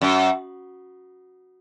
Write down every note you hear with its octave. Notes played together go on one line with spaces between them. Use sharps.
F#2